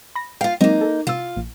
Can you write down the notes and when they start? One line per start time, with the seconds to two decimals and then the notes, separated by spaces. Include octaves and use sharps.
0.15 B5 A#6
0.41 F4 F5 G5
0.61 F#3 G#3 A#3 C4 D#4
0.81 A4
1.07 C3 F4 E6
1.37 A#1